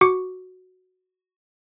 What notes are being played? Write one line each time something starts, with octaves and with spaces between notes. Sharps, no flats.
F#4 D6 C#7